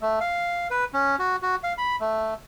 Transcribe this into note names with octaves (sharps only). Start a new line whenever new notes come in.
A3
F5
B4
C#4
F#4
F#4
F5
B5
A3